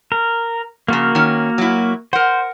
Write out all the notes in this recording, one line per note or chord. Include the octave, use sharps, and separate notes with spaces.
A#4
F2 C#3 A#3 F#4 A#4
D#3 C#4
F#3 E4
A#4 C5 F#5